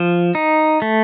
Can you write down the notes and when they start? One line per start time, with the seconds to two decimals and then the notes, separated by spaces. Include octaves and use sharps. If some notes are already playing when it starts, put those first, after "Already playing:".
Already playing: F3
0.35 D#4
0.82 A3